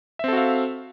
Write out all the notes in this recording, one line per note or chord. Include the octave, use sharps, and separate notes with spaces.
C4 F#4 A4 E5 F5